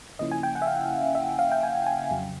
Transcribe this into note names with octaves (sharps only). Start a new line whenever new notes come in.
C#3 F3 A#3 C#4 E4 D#5
G#5
G5
F#5
E5
F5
E5
F5
G5
G#5
G#5
F2 C#3 F#3